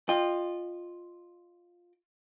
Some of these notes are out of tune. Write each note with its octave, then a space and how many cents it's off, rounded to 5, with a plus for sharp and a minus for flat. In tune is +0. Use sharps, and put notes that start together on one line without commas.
F4 +5 D#5 -25 G5 +10